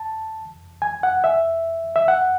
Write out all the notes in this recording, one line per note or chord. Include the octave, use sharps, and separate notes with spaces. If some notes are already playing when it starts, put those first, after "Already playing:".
Already playing: A5
G#5
F#5
E5
E5
F#5